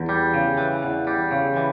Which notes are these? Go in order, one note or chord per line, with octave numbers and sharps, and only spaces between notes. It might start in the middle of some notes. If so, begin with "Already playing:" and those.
Already playing: E2
G3
C#3
E3
E2
G3
C#3
E3